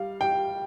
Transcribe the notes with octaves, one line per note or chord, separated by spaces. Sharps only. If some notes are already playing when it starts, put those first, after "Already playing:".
Already playing: G3 F5
G5